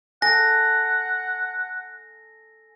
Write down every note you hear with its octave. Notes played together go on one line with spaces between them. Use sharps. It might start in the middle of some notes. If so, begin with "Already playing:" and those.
A4 F#5 G#5 A#6